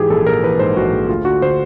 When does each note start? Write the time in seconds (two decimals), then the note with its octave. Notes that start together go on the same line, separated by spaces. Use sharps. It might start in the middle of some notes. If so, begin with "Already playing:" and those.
Already playing: G#2 E3 G4 G#4
0.10 A#1 A4
0.26 A#1 A#4
0.43 E3 B4
0.59 G#2 C5
0.76 A#1 F#4
0.93 A#1
1.09 D2 F4
1.25 D3 F#4
1.42 D3 C5